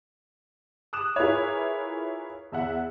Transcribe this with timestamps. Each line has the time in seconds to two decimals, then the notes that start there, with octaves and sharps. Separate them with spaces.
0.93 D6 D#6 F#6 E7
1.16 E4 F4 G#4 A#4 B4 C#5
2.52 E2 E5 F#5